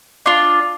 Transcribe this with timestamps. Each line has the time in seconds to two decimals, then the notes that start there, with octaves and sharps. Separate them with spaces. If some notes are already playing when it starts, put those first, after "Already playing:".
0.26 D4 F4